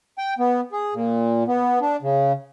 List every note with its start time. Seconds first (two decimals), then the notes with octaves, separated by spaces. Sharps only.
0.18 G5
0.39 B3
0.72 G#4
0.94 A#2
1.48 B3
1.81 D4
2.02 C#3